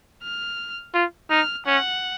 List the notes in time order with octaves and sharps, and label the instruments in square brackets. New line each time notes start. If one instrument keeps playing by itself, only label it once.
[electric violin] F6
[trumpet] F4
[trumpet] D#4 [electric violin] F6
[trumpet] C#4 [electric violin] F#5